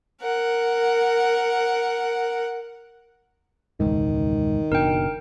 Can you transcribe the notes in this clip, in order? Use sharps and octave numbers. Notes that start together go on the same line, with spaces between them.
A#4 F#5
E1 C#2 G#2 D#3
F#1 B2 D4 A#4 G5